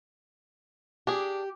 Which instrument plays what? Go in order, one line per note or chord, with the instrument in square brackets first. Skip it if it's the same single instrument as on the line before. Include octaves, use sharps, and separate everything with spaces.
[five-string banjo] D4 G#4 [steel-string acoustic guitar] G4